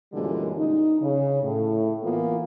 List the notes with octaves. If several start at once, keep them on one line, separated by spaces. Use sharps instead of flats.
F#2 A#2 D3 E3 G3 G#3
D#4
C#3
A2
E3 A#3 B3 E4 F4